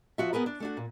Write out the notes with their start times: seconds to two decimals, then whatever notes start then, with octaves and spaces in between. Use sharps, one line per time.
0.18 F3 F#4 E5
0.33 B3 G#4 A#4 B4
0.46 D4
0.60 A3 D4 F#4
0.77 A#2